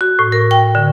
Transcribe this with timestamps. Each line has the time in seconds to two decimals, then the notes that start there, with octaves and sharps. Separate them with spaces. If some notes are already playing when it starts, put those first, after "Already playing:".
0.01 F#4
0.19 A2
0.32 A#4
0.51 G5
0.75 D3